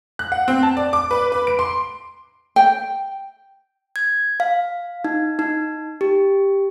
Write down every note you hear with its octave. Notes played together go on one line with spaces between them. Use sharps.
F#6
F#5
C4
A5
D5
D6
B4
B4
D7
C6
G5
G#6
F5
D#4
D#4
G4